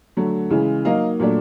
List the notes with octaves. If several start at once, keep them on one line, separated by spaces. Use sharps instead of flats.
D3 F#3 A3
C#3 E3 G#3
F#3 A#3 D#4 D#5 F5
A#2 F#3 A3 D4